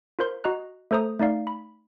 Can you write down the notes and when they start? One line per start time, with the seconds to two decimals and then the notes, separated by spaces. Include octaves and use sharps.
0.19 F4 A#4 C5 C6
0.44 F#4 D#5 A#5 F#6
0.91 A3 A4 C5 A#5 D#6
1.19 A3 D#4 D5 F5
1.47 B5